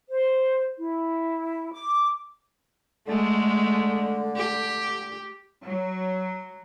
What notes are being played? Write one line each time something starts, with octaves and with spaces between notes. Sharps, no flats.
C5
E4
D6
D3 G#3 A3
G4
F#3